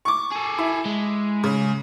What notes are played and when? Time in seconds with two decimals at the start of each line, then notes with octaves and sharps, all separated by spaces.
0.05 C#6 D6
0.32 G#4 A4
0.58 E4
0.85 G#3
1.43 C#3